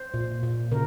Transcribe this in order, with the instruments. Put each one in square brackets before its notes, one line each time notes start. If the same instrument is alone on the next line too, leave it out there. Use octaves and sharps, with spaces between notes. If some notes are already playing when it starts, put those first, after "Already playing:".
Already playing: [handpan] C5
A#2
A#2
C#3 A#4